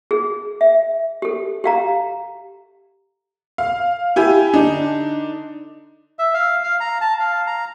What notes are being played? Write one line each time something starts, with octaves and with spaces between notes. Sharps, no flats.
G#4
E5
G4 A4
G4 F5 A#5
F5
E4 G4 G#5
D3 D4 D#4
E5
F5
F5
A#5
A5
F5
A#5